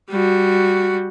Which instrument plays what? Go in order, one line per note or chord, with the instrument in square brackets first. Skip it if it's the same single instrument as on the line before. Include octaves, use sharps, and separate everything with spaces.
[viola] G3 F#4